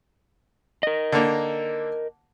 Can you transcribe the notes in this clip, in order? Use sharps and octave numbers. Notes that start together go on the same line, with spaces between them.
A#4 D#5
D3 A#3